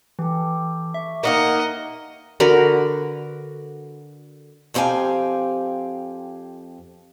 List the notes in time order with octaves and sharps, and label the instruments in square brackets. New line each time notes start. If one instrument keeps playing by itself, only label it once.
[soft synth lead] E3 [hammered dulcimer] G4 A4
[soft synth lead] E5 [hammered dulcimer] C#6 D6
[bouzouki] A#3 D#4 A#4 [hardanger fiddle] D#5 F#5
[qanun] D3 F#4 A#4 B4
[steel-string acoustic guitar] F2 C4 G4 F5 G#5